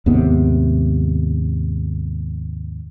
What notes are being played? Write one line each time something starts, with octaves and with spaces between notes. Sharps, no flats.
D#2 G#2 C3 B3